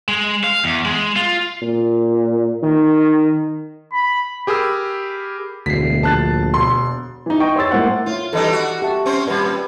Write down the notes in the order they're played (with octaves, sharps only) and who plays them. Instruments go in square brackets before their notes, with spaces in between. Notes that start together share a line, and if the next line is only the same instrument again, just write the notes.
[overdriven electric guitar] G#3
F5
E2
G#3
F4
[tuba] A#2
D#3
[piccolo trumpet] B5
[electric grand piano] G4 G#4 A#4 B5 E6
[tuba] E1 [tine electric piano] D2 C7 [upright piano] B6
[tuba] A#1 [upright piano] A5 F#6 A6
[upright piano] E1 C6
E3 D#4
D#5 G5 C#6
C#5 C6 E6 A6
A2 G#3 A#3 C5 F#5
[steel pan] E4 C#5 [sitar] F4
[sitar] E3 G3 D#4 [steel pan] A4 D#5 G#5
[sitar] F#4
[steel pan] G4 E5 A5
[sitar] C4 C#4 C5
[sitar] A#2 G3 [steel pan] B4 D5